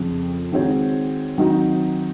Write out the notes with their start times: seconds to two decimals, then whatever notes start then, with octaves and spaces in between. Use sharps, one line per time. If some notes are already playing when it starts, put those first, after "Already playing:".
Already playing: F2 C#3 F3 C4
0.52 D#3 G#3 C4 F#4 C#5
1.38 D#3 F#3 C4 D#4 F#4